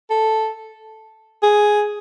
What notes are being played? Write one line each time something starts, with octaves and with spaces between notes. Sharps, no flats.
A4
G#4